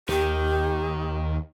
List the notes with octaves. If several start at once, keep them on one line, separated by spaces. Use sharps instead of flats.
D#2 D#3 G4